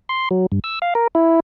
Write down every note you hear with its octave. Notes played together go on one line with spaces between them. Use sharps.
C6
F#3
G2
E6
F5
A#4
E4